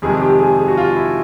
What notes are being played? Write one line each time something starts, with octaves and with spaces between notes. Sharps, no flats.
F2 C3 D#3 G#3 G#4
G4
G#4
G#4
F#4
F4
E4